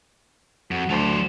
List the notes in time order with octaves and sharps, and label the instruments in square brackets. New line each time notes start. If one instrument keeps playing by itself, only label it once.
[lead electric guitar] F2 [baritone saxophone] F#4
[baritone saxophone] D2 [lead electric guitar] F#3 C5